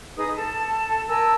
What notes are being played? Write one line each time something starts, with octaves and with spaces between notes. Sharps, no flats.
D#4 G#4 B4 D#6
A4 A5
A#4 G#5 A5 E6